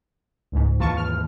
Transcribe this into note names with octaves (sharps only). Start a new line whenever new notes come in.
C#2 G#2
D#2 G#2 E3 F4 A5 C#6
F6